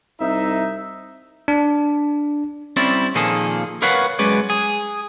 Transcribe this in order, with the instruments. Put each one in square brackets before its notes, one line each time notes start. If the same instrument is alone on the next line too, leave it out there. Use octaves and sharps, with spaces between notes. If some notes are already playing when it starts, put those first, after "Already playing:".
[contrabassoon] C2 [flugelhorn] D#4 [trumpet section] E5
[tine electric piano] D4
[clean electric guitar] G3 C4 C#4 E4 D5
A#2 D#3 F3 A#3 G#4 A4
A#4 B4 C#5 F5 F#5
F#2 G#3 B4 C#5 D5
G#4